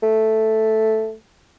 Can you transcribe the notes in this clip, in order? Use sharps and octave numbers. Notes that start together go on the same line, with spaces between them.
A3